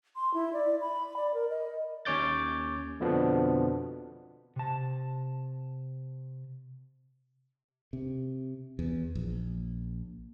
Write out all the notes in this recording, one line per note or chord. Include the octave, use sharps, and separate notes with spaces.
C6
E4
D5
B5
D5
A#4
D#5
D#2 C#4 C#5 D6 G6 A6
F2 B2 D3 F3 B3 D4
C3 A5
C3
E2
A#1